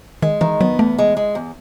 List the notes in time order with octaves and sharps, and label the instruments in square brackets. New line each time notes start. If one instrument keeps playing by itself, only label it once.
[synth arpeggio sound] D#3 [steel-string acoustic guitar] G#3
[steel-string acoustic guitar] D#3 [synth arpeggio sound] E3
[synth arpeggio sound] F#3 [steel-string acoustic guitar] B3
[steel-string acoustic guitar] E2 [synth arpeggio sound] A3
[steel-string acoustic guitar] G#3
G#3
E2